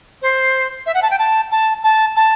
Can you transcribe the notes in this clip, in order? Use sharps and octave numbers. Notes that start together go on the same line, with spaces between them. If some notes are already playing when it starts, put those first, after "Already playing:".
C5
E5
F#5
A5
G5
A5
A5
A5
A5